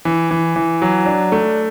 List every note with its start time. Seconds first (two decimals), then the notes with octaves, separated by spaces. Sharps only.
0.05 E3
0.31 E3
0.56 E3
0.82 F#3
1.06 D4
1.32 A3